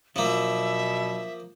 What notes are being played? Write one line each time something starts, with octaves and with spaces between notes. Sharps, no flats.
B2 F3 F#3 A#3 D4 E5